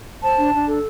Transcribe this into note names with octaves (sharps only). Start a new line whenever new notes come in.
C5 A5
D4
D4
A4